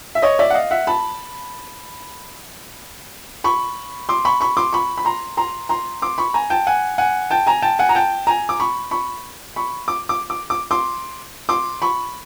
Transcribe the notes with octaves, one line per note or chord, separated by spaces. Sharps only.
E5
C#5 D#5
D5 E5
F#5
D#5 F5
E5 F#5
A5 B5
B5 C#6
C6 D6
B5 C#6
B5 C#6
C6 D6
B5 C#6
B5
A#5 C6
A#5 C6
A#5 C6
C6 D6
B5 C#6
G#5 A#5
G5 A5
F#5 G#5
F#5 G#5
G5 A5
G#5 A#5
G5 A5
F#5 G#5
A#5
G5 A5
G#5 A#5
D6
B5 C#6
B5 C#6
B5 C#6
D6
D6
D6
D6
C6 D6
C6 D6
B5 C#6